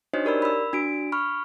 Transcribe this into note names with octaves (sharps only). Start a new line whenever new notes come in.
D4 D#4 F#4 C5 C#5 D#5
G4 A#4 D5 B5 E6
B5 E6
D4 F#4 D7
B5 C#6 F6